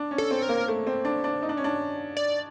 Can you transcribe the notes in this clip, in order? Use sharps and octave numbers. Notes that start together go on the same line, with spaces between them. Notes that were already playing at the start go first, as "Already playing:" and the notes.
Already playing: D4
C#4
A4
C4
A#4
A#3
A3
C4
D4
D4
D#4
D4
C#4
D4
D5